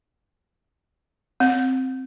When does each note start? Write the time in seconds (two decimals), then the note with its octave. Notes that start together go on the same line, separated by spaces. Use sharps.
1.40 C4